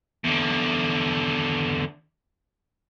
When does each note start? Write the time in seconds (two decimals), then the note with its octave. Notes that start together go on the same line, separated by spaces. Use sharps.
0.24 E2 D3